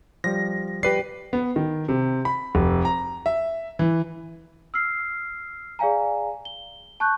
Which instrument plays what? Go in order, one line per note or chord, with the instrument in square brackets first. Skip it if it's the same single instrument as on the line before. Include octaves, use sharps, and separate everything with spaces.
[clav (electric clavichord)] F3 G3 [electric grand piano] A#6
[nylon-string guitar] G4 D5 [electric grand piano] B4 C7
[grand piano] B3
D#3
C3
B5
F1
A#5
E5
E3
[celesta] E6 F6 C7
G#4 D5 F5 G#5 A#5
G7
A5 C#6 F#6 G6